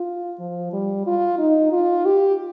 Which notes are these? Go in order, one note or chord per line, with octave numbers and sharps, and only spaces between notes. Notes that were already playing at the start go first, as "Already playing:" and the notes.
Already playing: F4
F3
G3
F4
D#4
F4
G4